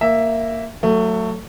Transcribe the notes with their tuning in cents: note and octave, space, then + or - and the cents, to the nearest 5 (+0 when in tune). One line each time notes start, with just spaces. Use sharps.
A#3 -10 E5 +0
F#3 +0 A3 +20